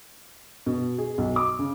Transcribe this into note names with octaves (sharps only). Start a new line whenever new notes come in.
B2
G#4
B1
D6
C#3